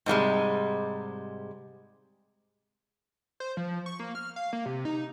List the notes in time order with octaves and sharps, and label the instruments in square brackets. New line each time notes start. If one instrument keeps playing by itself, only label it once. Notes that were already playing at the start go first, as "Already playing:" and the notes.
[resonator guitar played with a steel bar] G#2 C3 G3 G#3
[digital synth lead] C5
F3
C#6
A#3
F6
F5
A#3
C3
D#4